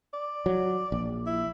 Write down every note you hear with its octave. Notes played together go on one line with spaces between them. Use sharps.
D5
F#3
A#1
E4